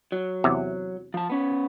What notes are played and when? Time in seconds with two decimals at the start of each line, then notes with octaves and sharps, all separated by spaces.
0.12 F#3
0.44 E2 C3
1.14 F3 A5
1.30 B3 C#4